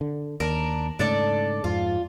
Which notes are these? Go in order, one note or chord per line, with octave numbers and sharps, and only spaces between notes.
D3
D#2 D4 A#4
G#2 C#3 A3 D4 A4 D5
F2 G#2 F4